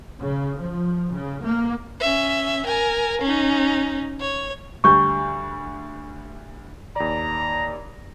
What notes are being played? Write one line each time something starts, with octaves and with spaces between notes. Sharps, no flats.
C#3
F3
C#3
A#3
C#4 E5
A#4 G#5
C#4 D#4
C#5
D2 G3 C#6 G6
D#2 D5 A#5